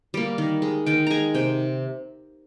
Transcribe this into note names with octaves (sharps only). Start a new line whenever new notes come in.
G3 A#3
D#3
G#3
D#3 G5
G#3 G#5 A#5
C3 G5